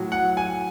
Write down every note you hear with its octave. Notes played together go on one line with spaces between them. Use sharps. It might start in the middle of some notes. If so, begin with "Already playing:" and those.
Already playing: A2 F#3
F#5
G#5